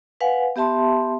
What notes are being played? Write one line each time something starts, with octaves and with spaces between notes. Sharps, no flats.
B4 F5 F#5 G#5
B3 G4 E5 A5 C6